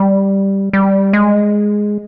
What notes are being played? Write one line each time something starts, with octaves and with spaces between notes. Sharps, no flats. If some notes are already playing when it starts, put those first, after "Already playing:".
Already playing: G3
G3
G#3